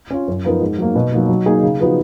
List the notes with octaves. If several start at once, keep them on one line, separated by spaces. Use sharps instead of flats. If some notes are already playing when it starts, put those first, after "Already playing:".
C#4 F4
F#2
F3 B3 D#4 A#4
G#2
F#3 A#3
B2
F#3 A#3 D#4
F#3
A#3 D#4 G#4
C#3
F3 B3 D#4 F#4